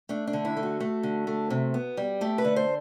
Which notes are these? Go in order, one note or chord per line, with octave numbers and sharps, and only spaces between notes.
A3 D4
D4
D3
E4
A3
F#4
A3
D3
A3
C3
B3
G3
A3 G4
B4
D3
C5